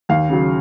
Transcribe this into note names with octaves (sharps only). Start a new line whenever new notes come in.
D#2 F5
C#3 F#3